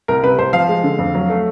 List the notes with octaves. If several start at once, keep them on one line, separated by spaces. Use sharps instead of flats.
C2 A#4
C3 B4
C2 C5
F3 F5
G#3
D3
F2
F#3
A3